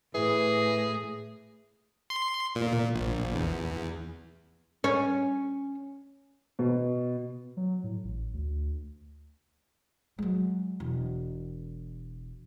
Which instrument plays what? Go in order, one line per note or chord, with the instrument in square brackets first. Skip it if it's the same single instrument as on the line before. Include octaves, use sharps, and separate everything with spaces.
[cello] A2 [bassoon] E3 [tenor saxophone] G#4
[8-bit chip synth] C6
A#2
A#2
A#1
E2
[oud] C#4
[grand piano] B2
[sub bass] F#3
A2
A1
D2
[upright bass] F#3 G#3
E1